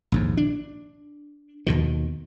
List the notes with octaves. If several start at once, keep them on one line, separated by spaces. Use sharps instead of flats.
A#1 D#2 G#2
D4
D#2 B2 D#3